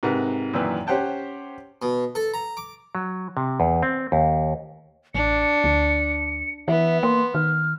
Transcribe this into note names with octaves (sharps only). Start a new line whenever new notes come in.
G#2 C3 A#4 B4 F#5
F#2 A#2 D#3 E3 B4
C#4 G4 C5 F#5 G5 A5
B2
A4
A#5
D6
F#3
C3
E2
C4
D#2
A1 D4 C#7
D2
E3 B3 E5
A#3 C6
D#3 F6